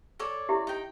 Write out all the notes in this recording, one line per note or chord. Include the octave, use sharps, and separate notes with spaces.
A4 C#5 D5
E4 G4 E5
D#4 G5